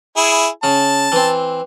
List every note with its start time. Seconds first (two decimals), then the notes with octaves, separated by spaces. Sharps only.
0.17 E4 G#4
0.63 C#3 A5
1.12 E3 C4